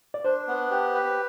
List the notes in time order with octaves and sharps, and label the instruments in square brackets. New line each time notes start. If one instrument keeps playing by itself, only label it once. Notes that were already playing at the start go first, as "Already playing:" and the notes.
[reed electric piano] D5
[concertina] D4 [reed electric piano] C5
[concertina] B3
G4
B4